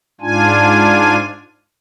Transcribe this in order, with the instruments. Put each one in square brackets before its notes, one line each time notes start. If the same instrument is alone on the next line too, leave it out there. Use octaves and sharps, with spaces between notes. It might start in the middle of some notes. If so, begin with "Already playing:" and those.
[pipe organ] G#2 D4 F4 G#5